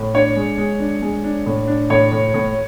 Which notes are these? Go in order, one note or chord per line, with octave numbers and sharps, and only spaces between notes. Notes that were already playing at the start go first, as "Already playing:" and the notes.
Already playing: A2
D4 C#5
G#3
G#3
D4
G#3
D4
A2
D4
A2 C#5
A2
A2